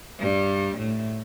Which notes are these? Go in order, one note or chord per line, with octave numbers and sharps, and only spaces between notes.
G2 G3
A2 A3